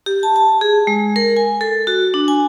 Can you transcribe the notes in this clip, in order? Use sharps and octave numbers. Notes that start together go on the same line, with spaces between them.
G4
A5
A5
G#4
G#3
A#4
G#5
A4
F#4
D4
G#5